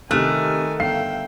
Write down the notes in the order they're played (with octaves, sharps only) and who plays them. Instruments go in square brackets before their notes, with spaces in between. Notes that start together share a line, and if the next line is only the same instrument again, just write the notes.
[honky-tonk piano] C3 F6 F#6 [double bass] D#3 [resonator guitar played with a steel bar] A3 [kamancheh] G#5
[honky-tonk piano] G1 F5 C7 [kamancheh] E5 G5